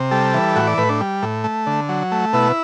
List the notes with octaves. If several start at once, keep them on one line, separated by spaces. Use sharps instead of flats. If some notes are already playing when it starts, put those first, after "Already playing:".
Already playing: C3
G3 A4
E3
A2 F#4
D5
A2 B4
D4
G3
A2
A3
D3
F#3
A3
B2 E4